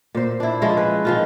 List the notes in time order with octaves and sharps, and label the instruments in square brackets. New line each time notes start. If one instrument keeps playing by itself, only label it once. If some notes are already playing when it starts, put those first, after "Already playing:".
[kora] A#2 C5
D4 E4
F3 G#3 C#4 E4
B4
D#3 F3 F4